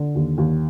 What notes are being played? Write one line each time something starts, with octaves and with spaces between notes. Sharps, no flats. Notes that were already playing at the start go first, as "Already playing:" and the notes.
Already playing: D3
D#2
D#2